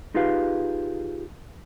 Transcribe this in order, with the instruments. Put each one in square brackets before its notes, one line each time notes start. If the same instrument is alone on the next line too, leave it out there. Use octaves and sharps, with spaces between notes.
[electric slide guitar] D#4 F4 G4 G#4 B4 F5